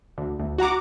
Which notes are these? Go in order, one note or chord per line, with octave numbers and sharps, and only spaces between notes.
D2
D2
F#4 F#5 A#5 D6